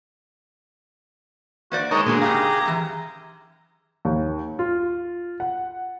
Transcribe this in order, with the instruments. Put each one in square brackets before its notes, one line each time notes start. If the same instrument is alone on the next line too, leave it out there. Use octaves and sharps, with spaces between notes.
[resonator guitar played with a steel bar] A#3 C5 D5 [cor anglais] F#4
[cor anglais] G#3 [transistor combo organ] D#4 A#4 C#5 [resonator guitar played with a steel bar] A5
[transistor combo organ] A#2 [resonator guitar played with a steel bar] D3 B3 F#4 [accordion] G#4
[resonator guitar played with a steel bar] G#2 C#3 F5 [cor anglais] G4 [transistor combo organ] A#5
[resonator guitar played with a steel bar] F#2 E3
[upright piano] D#2
F4
F#5